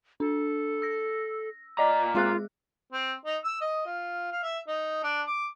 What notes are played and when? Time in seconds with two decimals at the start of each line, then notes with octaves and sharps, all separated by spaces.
0.20 D4 A4
0.82 E6 A#6
1.78 A#2 D5 D#5 A#5 D6
2.15 G#3 F4 G#4 F#6
2.93 C4
3.26 D#4
3.44 E6
3.61 D#5
3.86 F4
4.32 F5
4.43 E5
4.68 D#4
5.04 D4
5.27 D6